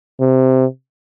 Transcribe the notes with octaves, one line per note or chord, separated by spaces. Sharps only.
C3